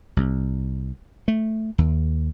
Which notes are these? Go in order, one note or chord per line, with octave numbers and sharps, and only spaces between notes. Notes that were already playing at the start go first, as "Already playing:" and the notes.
C2
A3
D#2